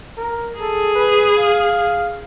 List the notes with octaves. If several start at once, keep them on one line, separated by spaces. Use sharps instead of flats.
A#4
G#4 A4
B4
F5